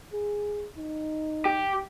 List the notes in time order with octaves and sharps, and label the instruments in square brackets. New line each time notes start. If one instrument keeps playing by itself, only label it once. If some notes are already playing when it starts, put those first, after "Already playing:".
[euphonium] G#4
D#4
[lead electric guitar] G4